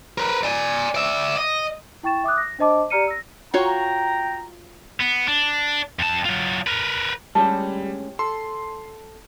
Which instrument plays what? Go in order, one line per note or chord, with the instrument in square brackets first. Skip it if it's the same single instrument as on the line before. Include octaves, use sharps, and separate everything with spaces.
[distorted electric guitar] A#4 B4
D5 G#5
D5 E5
D#5
[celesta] E4 G5 C#6 A6 E7
E5 D6 D#6 F#6
A#6
D4 C5 D#5 A5 D6
G4 D5 A#5 F6 C#7 D#7
E6 A#6
[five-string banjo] F4 F#4 C#5 [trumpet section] G5 A#5
[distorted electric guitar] B3
D4
F2 A5
F#3 F4
A#4 B4
[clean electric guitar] D2 G#3 C#4 [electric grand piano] G3 [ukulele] G4 A5
[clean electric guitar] A4 [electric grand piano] C6